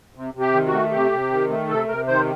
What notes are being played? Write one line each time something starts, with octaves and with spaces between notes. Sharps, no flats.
C3
C3
G4
D#3
F#4
A3
C3 G4
C3
D#3
A3
C3 A4
C3 A#4
D#3 C5